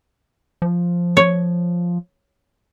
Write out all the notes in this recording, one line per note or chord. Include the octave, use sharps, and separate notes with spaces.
F3
C#5